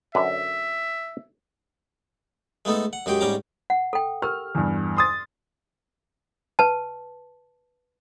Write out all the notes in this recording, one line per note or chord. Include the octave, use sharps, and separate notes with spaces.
F#2 D3 B4 E5
G#3 A3 B3 D#4 A4
F#5
F#2 G#3 F#4 G4 G5
G#2 G3 C#4 G5 A#5 D6
F#5
A4 G5
G4 A#4 F6
E2 G2
C6 D#6 A6
B4 A5